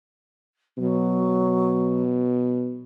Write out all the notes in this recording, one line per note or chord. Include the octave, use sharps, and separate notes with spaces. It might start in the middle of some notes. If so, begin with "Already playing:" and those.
B2 F#3